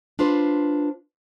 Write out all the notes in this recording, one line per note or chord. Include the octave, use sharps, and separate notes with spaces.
D4 F4 B4 C5